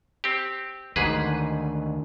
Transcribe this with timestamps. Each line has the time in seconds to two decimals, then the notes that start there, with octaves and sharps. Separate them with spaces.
0.24 C4 G4
0.96 D2 G#2 D#3 G#4 B4